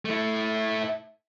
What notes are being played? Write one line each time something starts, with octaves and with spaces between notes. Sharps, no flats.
A3 E4